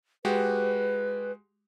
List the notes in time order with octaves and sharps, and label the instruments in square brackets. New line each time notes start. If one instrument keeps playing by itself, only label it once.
[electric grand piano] G#3 F#4 G4 [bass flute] B4